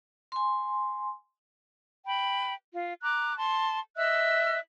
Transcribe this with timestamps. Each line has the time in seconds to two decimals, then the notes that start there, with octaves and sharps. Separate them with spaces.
0.32 G#5 C6
2.06 G5 B5
2.74 F4
3.02 A#5 D6 F#6
3.37 A5 C6
3.97 D#5 E5 E6 F#6